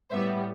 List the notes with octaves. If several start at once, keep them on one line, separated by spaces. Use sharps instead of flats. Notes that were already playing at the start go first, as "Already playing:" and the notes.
A2 G3 B3 C5 E5